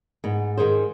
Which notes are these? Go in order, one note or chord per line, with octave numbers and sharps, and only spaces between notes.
G#2 B3
G#2 D#3 G#4 C5